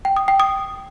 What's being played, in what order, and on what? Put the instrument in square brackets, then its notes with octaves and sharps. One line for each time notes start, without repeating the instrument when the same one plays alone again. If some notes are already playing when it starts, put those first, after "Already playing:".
[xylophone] G5
D#6
G5
D#6